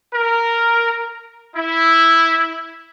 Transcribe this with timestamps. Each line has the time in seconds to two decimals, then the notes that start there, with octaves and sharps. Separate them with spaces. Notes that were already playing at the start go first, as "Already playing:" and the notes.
0.12 A#4
1.54 E4